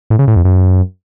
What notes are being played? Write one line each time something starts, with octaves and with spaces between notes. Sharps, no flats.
A2
C#3
A2
F2
F#2